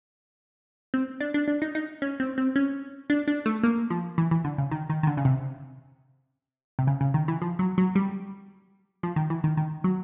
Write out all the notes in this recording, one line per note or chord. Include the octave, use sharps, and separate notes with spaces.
C4
D4
D4
D4
D#4
D#4
C#4
C4
C4
C#4
D4
D4
A3
A#3
F3
E3
E3
D3
C#3
D#3
D#3
D#3
D3
C#3
C3
C3
C#3
C#3
D#3
E3
F3
F#3
F#3
G3
F3
D#3
E3
D#3
D#3
F#3